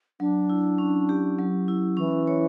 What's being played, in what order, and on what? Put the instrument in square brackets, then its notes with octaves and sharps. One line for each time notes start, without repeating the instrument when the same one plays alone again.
[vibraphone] F#3 [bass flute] D4
[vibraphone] E4
C#4
G4
F#3
E4
[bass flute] E3 [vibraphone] C#4
[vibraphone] C#5